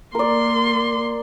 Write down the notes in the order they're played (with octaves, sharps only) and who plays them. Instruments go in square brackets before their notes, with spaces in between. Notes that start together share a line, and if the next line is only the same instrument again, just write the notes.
[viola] A#3 C6 [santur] A#4 D5